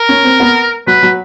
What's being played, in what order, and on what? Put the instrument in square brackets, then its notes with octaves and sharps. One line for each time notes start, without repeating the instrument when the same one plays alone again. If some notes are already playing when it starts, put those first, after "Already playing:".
Already playing: [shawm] A#4
[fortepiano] C#4
C4
B3
[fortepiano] F#3 [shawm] B4
[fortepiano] F#3